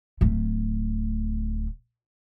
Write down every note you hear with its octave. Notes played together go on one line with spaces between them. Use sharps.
D1 A3